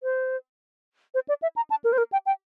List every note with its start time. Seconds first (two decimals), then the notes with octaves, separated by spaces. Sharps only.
0.03 C5
1.14 C5
1.28 D5
1.42 E5
1.56 A#5
1.70 A5
1.84 A#4
1.93 C5
1.98 A#4
2.12 G5
2.26 G5